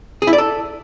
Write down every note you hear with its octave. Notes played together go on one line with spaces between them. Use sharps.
G#4
E4
D5
A4